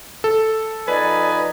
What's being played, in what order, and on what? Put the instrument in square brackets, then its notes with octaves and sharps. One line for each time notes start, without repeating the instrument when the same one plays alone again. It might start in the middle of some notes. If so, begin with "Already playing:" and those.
[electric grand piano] A4
[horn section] F3 D#4 G#5 [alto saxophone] B4 [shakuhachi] D5